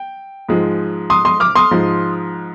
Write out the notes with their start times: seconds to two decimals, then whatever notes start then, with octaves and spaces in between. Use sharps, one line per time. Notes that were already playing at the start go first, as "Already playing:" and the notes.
Already playing: G5
0.49 G#2 F3 G#3
1.10 C6 D#6
1.25 C6 D#6
1.40 D6 F6
1.55 C6 D#6
1.71 G#2 F3 G#3